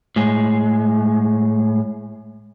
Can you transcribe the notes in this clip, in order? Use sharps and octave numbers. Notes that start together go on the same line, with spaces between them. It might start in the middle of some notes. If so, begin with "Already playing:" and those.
A2 G#3